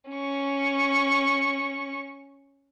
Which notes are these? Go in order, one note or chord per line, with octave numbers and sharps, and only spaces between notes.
C#4 C#6